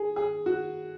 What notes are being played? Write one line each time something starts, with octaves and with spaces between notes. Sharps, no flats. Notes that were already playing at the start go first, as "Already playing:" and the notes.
Already playing: G#4
G#4
F#4